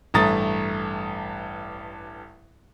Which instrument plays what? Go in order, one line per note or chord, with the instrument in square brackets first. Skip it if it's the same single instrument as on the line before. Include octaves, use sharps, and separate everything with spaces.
[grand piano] A1 G2 A3 A#5 D#6 A6